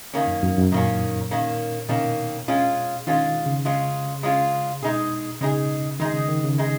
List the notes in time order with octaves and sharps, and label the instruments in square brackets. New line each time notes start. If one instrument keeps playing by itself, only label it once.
[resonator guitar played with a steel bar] D#3 A#3 C#4
[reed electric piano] F#2
F#2
F#2
[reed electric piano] A#2 [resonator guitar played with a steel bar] D#3 A#3 C#4
[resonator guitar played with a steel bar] D#3 A#3 C#4
[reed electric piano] B2 [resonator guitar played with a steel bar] D#3 A#3 C#4
[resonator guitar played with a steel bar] G#3 C#4 F4
[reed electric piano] D#3 [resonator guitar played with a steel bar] G#3 C#4 F4
[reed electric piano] C#3
[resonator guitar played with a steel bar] G#3 C#4 F4
G#3 C#4 F4
[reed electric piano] B2 [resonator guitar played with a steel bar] G#3 D#4 G#4
[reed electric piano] C#3 [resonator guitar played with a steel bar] G#3 D#4 G#4
[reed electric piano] D#3 [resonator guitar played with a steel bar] G#3 D#4 G#4
[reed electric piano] C#3
D#3
C#3
[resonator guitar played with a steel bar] G#3 D#4 G#4